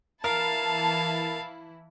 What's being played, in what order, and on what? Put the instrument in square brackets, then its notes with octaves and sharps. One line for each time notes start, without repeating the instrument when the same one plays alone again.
[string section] E3 E4 [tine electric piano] A#4 [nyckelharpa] F5 [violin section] A5